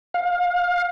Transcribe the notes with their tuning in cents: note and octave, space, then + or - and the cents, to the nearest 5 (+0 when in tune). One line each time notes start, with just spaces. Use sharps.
F5 +30